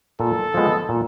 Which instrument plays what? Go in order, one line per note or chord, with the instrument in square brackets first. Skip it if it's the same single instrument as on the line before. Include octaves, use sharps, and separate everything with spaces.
[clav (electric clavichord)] A#2 [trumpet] A4
[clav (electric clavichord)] F3 G#3 B3
A#2